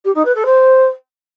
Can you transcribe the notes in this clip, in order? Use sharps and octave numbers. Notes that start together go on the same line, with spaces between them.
G4
D#4
B4
A4
C5